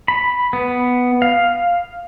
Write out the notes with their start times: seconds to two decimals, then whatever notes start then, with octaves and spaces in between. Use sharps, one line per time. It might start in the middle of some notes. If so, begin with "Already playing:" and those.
0.08 B5
0.53 B3
1.22 F5